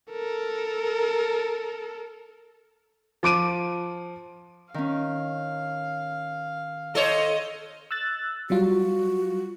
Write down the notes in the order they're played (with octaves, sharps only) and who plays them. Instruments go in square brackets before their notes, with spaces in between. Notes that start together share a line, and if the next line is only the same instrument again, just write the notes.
[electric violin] A4 A#4
[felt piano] F3 D6 D7 D#7
[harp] D#3 C#4 [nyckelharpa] F5
[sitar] A4 C5 C#5 [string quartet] D#5
[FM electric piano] E6 F#6 A6
[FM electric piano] F#3 G3 F4 [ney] F#4